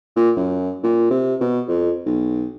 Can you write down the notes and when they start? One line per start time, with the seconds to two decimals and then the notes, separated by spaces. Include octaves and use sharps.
0.16 A#2
0.37 F#2
0.84 A#2
1.11 C3
1.41 B2
1.68 F2
2.06 B1